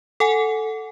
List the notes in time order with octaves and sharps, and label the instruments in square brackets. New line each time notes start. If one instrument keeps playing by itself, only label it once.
[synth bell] A4 F#5 G#5